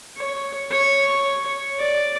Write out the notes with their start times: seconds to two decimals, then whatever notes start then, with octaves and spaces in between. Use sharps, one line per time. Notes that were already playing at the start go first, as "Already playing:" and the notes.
0.17 C#5
0.72 C#5
1.79 D5